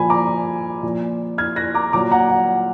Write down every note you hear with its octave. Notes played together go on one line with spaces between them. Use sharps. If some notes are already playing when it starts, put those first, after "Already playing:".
Already playing: A#2 F3 G#5 B5
A#5 D6
A#2 F3
F6 G#6
F#6 A#6
A#5 D6
A#2 F#3 A#5 D6
F#5 A#5
F#5